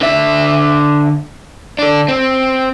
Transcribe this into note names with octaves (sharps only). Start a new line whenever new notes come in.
D3 E5
D4 A4
C4